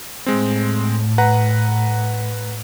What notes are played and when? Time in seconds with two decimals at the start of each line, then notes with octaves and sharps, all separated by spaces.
0.26 A2 G#3 C4
1.18 B4 F#5 A#5